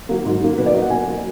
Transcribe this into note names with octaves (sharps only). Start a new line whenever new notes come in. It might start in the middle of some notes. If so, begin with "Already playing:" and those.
F#3 A#3
G#2
F#3 A#3
B2 B4
D5
F#3 A#3 D#5
F#5
B2 G#5
F#3 A#3